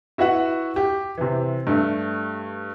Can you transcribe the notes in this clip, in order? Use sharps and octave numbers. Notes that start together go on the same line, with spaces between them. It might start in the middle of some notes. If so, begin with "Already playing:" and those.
E4 F#4 B4 E5 F#5
G4
C3 E3
G2 A3